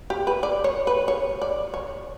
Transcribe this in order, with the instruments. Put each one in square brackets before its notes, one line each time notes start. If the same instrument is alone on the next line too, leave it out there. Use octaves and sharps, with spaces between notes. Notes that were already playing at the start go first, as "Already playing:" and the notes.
[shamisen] G4
B4
D5
C#5
B4
C#5
D5
C#5